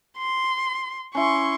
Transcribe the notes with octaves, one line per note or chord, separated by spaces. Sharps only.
C6
C#4 E4 C6 C#6